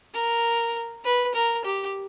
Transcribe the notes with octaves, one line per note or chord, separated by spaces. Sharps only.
A#4
B4
A#4
G4